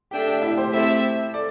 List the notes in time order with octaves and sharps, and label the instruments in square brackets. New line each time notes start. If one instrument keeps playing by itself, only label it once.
[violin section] D4 A4 E5 G5 [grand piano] G4
[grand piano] G4
E4
G4 C5
[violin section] A3 C4 E4 A4 E5 [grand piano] G4 C5
[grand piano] A4 D5